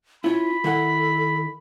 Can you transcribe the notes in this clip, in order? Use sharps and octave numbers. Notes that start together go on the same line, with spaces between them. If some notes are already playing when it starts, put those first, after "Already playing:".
C#4 E4 F4 B5
D#3 E4 A4 F#5